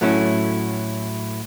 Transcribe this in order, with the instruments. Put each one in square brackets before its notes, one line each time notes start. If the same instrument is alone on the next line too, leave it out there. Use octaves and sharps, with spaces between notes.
[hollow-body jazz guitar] A2 F#3 A3 C#4 E4